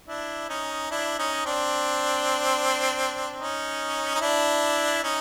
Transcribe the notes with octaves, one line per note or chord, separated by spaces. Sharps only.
D4 E4
C#4 D#4
D4 E4
C#4 D#4
C4 D4
C#4 D#4
D#4
D4 E4
C#4 D#4